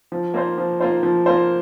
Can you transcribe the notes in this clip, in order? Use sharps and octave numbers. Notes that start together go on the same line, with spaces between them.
F3
A#3 F4 C5
F3
A#3 F4 C5
F3
A#3 F4 C5